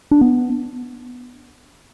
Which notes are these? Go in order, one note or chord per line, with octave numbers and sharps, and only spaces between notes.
D4
B3